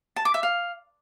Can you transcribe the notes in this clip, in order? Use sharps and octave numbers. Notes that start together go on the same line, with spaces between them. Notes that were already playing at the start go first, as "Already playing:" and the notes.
A5
D6
E5
F5